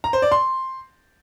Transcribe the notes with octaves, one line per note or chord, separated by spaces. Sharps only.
A#5
C5
D5
C6